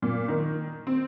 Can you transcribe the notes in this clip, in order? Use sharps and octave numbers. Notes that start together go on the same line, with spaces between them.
A#2
D#3
C4